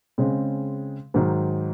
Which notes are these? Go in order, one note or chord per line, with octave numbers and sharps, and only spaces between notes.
C#3 G#3 C4
G#2 D#3 F#3